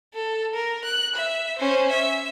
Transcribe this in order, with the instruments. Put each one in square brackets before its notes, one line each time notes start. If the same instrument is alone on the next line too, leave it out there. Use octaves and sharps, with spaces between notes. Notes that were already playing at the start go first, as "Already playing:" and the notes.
[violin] A4
A#4
F#6
E5
C#4 C5
E5